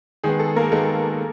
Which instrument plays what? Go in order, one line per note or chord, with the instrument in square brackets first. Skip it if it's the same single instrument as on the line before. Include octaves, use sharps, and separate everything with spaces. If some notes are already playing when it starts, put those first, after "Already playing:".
[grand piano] D#3 G#3 B3 [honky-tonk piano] G#4
[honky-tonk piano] A4
A#3 A#4
[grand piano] D#3 G#3 B3 [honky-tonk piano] A4